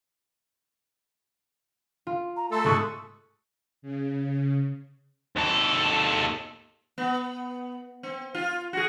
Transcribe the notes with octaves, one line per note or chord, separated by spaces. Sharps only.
F4
A#5
A3 A4 C6
C2 G#2 G#4 C#6 F#6
C#3
D#2 A4
B3
C4
F4
F#4 G#4